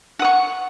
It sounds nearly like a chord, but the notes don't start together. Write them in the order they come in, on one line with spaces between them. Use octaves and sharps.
F#5 D#6 C#6